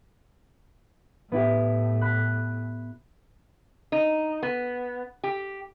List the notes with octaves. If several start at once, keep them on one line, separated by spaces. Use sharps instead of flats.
A2 B3 E4 G4
B5 F#6
D#4
B3
G4